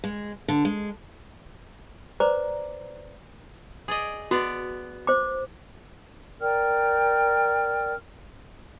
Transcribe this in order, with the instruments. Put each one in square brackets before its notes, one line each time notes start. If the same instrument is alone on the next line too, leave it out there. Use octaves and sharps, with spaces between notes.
[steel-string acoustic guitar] G#3
D3
G#3
[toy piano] B4 C5 D5 A#5 D6
[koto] G#4 D5 D#5
[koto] B3 D5 [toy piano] F#4
[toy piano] C5 D6
[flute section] A#4 D5 G5 F6